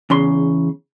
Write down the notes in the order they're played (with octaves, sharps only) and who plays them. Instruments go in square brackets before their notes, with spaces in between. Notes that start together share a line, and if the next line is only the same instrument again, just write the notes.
[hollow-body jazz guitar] E2 C#3 C6